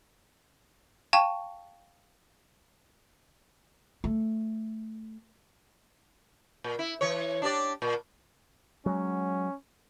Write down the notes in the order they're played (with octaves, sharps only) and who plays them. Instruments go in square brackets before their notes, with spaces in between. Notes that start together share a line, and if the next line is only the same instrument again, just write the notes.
[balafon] F5 G5 A5 C#6
[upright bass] A3
[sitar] A#2
E4
E3 C#5
D4 G4 D5
A#2
[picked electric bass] F#3 G#3 [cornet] C#4